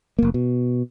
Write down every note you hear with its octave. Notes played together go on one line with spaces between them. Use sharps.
F1 A#3
B2